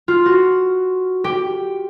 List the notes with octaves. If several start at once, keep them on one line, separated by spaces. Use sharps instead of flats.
F4
F#4
G4